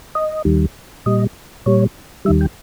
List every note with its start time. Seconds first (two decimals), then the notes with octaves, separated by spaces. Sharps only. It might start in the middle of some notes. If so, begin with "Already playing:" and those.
0.15 D#5
0.45 D#2 D#3 G3
1.06 A#2 G3 D#5
1.66 A#2 G3 C#5
2.25 D#2 D#3 G3 E5
2.41 G5